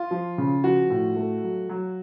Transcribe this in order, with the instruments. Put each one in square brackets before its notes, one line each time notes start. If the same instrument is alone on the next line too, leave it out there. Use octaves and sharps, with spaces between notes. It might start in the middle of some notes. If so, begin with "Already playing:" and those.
Already playing: [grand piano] F4
[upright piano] F3
C#3
[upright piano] F3 [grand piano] F#4
[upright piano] A2
A3
F#3
F#3